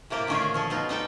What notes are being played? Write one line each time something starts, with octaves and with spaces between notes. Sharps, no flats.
A2 C3 A#3 G4 A5
D3 D#3 A3 C#4 F4 G#4
A#2
F3 G#4 A4
B2 D#4 F4
G3 D#4 A4 G5